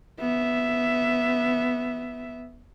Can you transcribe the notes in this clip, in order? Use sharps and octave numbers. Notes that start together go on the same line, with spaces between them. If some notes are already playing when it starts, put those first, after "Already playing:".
B3 E5